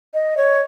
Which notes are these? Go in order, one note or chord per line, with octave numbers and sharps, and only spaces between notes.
D#5
C#5